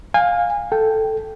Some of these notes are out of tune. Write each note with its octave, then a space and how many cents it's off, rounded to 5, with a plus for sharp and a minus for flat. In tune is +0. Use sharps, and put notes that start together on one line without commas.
F5 +15 G#5 -25
A4 +0 G5 +0